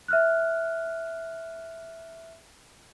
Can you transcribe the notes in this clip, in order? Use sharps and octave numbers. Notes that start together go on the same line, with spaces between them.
E5 F6 F#6